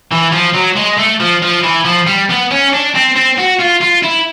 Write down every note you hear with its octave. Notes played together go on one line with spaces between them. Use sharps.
E3
F3
F#3
G#3
A3
F3
F3
E3
F3
G3
B3
C#4
D4
C4
C4
F#4
F4
F4
E4